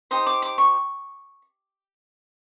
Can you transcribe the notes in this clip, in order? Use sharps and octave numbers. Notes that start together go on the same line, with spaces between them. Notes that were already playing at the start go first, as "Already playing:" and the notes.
D#4 G4 C5 D#6
D6
D6
C#6